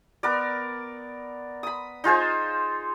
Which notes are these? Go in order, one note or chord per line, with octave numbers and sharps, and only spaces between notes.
B3 A#4 D5
B5 D#6
D#4 F4 G#4 C5